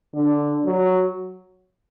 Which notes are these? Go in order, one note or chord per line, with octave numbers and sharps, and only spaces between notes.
D3
F#3